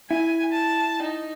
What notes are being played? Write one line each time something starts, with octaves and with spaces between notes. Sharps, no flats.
E4 G#5
A5
D#4